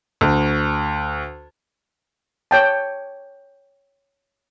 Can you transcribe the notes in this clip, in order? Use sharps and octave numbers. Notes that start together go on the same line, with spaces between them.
D2
C#5 G5 A5